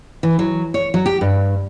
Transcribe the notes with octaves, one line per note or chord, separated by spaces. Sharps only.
E3
F#3
C#5
F#3
G4
G2